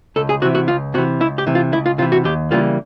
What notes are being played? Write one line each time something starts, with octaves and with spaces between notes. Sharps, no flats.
C#2 A4
G#4
C3 E3 F#4
F#4
C#2 F4
C3 E3 F#4
C#2 E4
G4
C3 E3
F4
C#2 E4
F4
C3 E3 F4
F#4
D#2 G4
C#3 E3 G3 A#3 F4